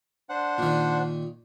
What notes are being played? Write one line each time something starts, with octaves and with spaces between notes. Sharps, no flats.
D4 C5 F#5
A#2 D#3